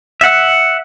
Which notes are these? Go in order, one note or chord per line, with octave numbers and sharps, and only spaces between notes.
E5 F#5